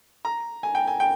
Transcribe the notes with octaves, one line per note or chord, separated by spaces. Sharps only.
A#5
G#5
G5
G#5
G5